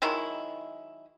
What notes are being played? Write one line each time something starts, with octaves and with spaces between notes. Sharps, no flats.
D#3 F#3 G#3 E4